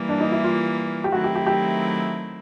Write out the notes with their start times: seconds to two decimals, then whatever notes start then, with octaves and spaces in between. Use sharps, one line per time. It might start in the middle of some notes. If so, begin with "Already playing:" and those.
Already playing: E3 G3 A#3
0.09 D4
0.20 D#4
0.32 E4
0.44 F4
1.04 G4
1.12 D#3 F#3 A3 C4 E4 F#4
1.24 G4
1.35 G4
1.46 G4